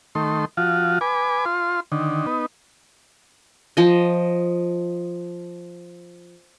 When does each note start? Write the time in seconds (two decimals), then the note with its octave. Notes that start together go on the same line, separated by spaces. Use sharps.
0.15 D#3 A3 C6
0.57 F3 F4 F#4
1.01 B4 G#5 D6
1.45 F4 C6
1.92 D3 D#3
2.26 B3 D#4
3.77 F3 D#5